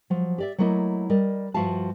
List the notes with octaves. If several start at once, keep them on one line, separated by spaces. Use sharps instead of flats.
F3 F#3
G4 D5 E5
F#3 A3 A#3 E4 D#5
G3 A#4 D5 D#5
G2 F3 F#4 E5 F5 A5